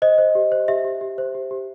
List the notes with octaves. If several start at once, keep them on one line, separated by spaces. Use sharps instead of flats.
C5 D#5
C5
G4
C5
G4 E5
G4
G4
C5
G4
G4